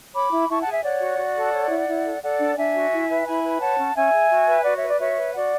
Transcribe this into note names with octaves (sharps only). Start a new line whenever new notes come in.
C#5 B5 D6
E4
E4 A5 C#6
F#5 A5
G#4
E5 G#5
C#5 D5 F#5
F#4
F#4
A4
C#5
E4
E4
A4
A4 D5 F#5
D4
D4 E5 G#5
F#4
E4
B4
E4 G#5 B5
B4
C#5 F#5 A5
C#4
C#4 E5 G#5
G#4
F#4
B4
F#4 D5 F#5
C#5 E5
B4 D5
F#4 C#5 E5
B4
F#4 D5 F#5